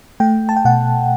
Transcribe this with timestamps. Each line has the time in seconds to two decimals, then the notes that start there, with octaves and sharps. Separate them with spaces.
0.20 A3 G5
0.49 A5
0.56 G5
0.65 B2 F#5